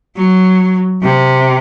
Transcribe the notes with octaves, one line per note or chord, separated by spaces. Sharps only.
F#3
C3